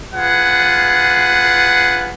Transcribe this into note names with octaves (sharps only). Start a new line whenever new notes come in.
F4 G#4 B4 F#5